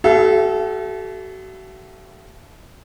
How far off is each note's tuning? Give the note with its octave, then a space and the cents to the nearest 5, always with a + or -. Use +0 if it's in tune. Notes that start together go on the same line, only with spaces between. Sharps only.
F#4 +40 A4 -30 E5 +35